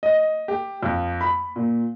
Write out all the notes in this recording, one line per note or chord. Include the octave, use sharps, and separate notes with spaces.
D#5
G4
F2
B5
A#2